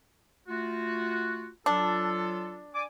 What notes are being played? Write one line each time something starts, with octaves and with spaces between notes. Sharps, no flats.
A3 F4 F#4
F#3 D4 F4 A4
D5 G#5 D6